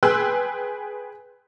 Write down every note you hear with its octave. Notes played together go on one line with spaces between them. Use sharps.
G#4 B4 G5 C6 E6 F#6